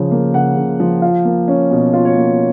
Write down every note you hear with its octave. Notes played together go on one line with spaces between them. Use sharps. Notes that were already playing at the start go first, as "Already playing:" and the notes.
Already playing: C#3 F3
A#3
C#3 F#5
C#3
F3
F4 F5
A#3
C#4
B2
F4
C#5
A#3